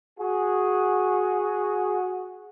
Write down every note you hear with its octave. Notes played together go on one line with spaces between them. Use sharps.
F#4 G#4